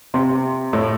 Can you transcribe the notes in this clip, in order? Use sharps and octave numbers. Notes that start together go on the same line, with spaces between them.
C3
A2